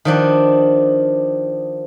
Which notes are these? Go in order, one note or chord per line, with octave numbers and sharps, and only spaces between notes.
D#3 F3 D4